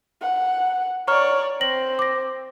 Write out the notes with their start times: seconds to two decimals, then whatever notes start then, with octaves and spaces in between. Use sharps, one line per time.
0.22 F#5
1.07 C#5 D5 A#5 C#6 F6
1.61 C4 A#6 F#7
1.99 D6 A#6